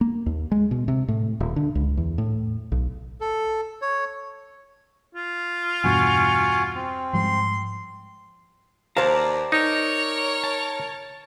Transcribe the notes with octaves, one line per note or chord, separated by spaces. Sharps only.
A#3
D#2
G#3
B2
C3
A2
D#1
D3
C#2
E2
A2
B1
A4
C#5
F4
E2 G2 B2 F#4 F#5 G#5
C4
G#2 F3 G3 C6
D#2 C5 D5 F5 A5 A#5
D#4 A#4 C#5
A5